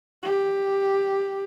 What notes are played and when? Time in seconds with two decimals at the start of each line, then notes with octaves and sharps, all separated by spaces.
0.23 G4